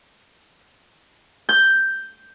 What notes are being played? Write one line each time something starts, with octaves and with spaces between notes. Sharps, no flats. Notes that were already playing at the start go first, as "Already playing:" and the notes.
G6